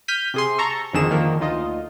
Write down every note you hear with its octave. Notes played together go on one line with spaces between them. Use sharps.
F6 G6 B6 D#7
C3 G#4 C6
A5 A#5 C#6 E6
G1 F2 D3 D#3 G#4 E7
D3 D#3 F3 A#3
D2 D#4 F4 D#5